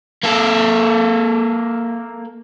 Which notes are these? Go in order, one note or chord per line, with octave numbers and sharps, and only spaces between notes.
A#3 A4